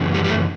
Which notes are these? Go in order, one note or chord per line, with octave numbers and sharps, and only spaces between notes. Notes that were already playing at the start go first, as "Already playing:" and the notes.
Already playing: F#2 C#3 E3
G3
G3
A3